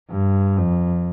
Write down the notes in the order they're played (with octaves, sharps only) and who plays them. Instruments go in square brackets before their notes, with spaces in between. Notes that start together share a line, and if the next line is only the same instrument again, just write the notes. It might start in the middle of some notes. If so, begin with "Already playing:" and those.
[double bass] G2
F2